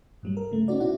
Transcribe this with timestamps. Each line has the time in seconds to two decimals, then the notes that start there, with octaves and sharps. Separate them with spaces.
0.23 G2 F#3 G3
0.37 A#4
0.52 C#3 A3
0.68 C4 C#4 D#4 F#4 D5
0.80 B2 E4 F#4 F#5